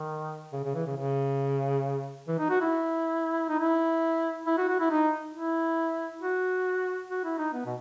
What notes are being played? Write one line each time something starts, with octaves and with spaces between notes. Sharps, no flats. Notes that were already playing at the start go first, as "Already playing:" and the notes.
Already playing: D#3
C#3
C#3
E3
C#3
C#3
E3
D#4
F#4
E4
D#4
E4
E4
F#4
F#4
E4
D#4
E4
F#4
F#4
E4
D#4
B3
B2